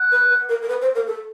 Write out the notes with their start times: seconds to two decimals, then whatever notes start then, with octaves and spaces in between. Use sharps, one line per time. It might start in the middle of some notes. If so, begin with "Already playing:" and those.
Already playing: F#5
0.12 B4
0.30 B4
0.49 A#4
0.62 A#4
0.68 B4
0.82 C5
0.95 A#4
1.07 A4